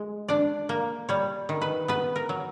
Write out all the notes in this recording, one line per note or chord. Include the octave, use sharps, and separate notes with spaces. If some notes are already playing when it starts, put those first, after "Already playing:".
Already playing: G#3
D4 D5
A#3
G3 C#5
D#3
B4
B3 B4
A#4
F#3